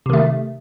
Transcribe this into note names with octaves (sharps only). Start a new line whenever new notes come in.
C3 D#3 A3